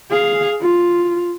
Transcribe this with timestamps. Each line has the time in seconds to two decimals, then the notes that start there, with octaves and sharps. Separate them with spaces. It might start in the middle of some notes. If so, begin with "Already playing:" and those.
0.11 G#4 F5
0.62 F4